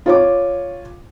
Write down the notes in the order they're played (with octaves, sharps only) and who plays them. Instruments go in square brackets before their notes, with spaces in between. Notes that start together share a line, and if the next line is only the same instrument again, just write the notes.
[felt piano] F4 C#5 D6